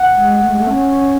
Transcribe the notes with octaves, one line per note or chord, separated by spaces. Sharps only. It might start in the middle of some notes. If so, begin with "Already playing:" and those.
Already playing: F#5
G#3
A3
G#3
A3
C#4